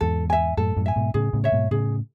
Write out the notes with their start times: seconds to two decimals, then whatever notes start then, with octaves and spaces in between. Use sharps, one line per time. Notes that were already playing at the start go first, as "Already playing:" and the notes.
0.01 E2 G#2 A4
0.30 E5 G#5
0.57 F#2 A2 A4
0.76 F#2 A2
0.86 E5 G#5
0.96 G#2 B2
1.14 A2 C#3 G#4
1.33 A2 C#3
1.44 C#5 E5
1.52 G#2 B2
1.71 A2 C#3 G#4